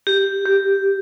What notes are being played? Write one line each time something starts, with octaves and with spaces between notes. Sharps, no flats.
G4
G4